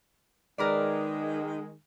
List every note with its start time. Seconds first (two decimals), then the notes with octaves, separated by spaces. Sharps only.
0.58 D#3 G#3 A#4 B4 D5